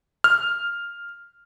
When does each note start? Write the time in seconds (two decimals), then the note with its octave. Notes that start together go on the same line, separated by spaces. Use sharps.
0.24 F6